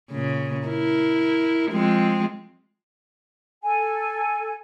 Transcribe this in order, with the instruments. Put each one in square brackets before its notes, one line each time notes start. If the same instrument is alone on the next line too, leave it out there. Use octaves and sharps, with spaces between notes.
[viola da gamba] A#2 C#3
E4 A#4
F3 G#3 C4
[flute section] A4 G#5